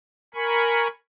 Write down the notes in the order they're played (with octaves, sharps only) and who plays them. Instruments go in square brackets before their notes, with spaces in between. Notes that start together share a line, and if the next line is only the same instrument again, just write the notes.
[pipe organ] A#4 G#5 B5 C#6